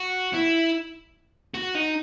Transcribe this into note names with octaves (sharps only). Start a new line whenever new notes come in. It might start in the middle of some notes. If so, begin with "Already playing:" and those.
Already playing: F#4
E4
F#4
D#4